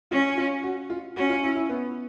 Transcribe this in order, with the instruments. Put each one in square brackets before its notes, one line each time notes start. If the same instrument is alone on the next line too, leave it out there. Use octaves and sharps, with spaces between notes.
[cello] C#4 [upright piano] F4
[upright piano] F4
F#4
F4
[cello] C#4 [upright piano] F#4
[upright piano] F4
E4
E4
B3